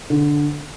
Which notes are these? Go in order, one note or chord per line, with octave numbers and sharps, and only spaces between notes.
D3